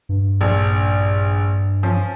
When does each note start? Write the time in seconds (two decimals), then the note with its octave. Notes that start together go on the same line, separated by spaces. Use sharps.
0.09 G2
0.41 A#1
1.83 F3 C#4